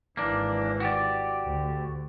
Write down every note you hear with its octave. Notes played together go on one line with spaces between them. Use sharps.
G#1 E3 A#3 D4
F#4 G4 D5
D2